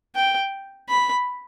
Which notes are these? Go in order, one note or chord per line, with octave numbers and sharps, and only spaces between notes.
G5
B5